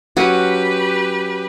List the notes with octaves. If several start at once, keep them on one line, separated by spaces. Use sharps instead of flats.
F#3 C#4 F#4 G4 B4